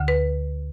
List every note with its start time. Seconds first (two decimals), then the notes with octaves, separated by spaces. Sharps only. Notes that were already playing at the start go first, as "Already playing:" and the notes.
Already playing: D2 D3
0.08 B4